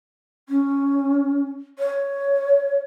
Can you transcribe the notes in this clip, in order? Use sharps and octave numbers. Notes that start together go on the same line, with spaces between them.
C#4
C#5